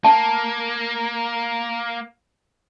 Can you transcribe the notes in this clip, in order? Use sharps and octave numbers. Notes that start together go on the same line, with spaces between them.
A#3 A5